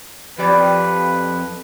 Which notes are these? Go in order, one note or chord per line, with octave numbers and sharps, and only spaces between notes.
F2 G4 B4 D5 G5